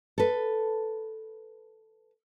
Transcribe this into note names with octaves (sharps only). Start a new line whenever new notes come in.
A4 B4